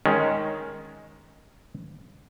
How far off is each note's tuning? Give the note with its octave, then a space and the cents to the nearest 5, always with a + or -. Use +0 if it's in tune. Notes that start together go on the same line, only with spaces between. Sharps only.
D#3 +0 G#3 +0 C#4 +0